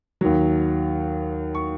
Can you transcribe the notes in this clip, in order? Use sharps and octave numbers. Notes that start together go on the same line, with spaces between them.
D#2 D#3 F#3
C#6